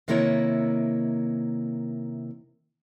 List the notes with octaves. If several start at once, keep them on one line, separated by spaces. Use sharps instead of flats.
C3 D#3 A#3 E4 B4 C#5